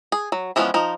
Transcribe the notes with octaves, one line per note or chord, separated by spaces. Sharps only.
G#4
F#3
E3 F3 G#3 B3 C#4
F3 D#4